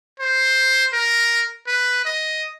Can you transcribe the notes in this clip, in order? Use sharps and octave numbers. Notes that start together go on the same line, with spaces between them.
C5
A#4
B4
D#5